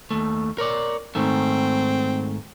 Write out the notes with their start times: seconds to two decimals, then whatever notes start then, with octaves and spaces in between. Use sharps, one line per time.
0.11 D#2 A3
0.58 A#4 C#5 D5
1.15 G#2 D#3 A3 C4